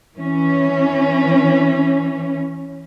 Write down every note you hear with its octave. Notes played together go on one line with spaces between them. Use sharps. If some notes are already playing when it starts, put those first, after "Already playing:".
E3 C#4